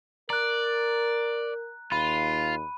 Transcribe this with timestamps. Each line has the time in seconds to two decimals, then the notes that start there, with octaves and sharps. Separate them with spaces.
0.30 A#4 D5 A#5 F#6
1.92 D#2 F4 B5 D#7